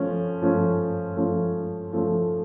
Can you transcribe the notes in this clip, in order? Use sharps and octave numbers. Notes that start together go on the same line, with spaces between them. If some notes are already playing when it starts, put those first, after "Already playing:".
Already playing: F3 A3 C#4
F3 A3 C#4
F3 A3 C#4
F3 A3 C#4